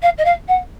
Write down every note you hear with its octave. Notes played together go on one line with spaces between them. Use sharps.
F5
D#5
F5
F#5